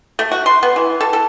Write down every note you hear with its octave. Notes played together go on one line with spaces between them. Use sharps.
A3
F#4
C6
B3
E3
A4
A4